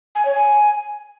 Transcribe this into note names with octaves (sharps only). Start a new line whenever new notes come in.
G#5
C#5
G#5